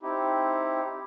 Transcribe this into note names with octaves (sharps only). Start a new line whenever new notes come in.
C4 D#4 E4 G4